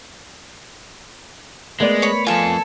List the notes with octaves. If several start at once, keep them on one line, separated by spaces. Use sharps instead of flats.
G#3 A3 B3 A#4 D5 G#6
C#5 B5
F2 F4 A4 G#5